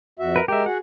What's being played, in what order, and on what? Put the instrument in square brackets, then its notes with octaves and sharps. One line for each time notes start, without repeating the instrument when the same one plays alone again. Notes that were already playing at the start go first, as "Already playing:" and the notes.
[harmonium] F2 F#4 E5
[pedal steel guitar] A#4 B4
[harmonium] G#3 A#4 [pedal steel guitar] G4 E5
[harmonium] F#4 G#4 [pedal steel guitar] F#5